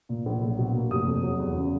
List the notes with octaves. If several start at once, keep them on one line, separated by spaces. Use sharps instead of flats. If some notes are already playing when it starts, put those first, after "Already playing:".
A#2
A#1
B1
B2
A#3
F1 D#6
F2
F#3
E2
C#3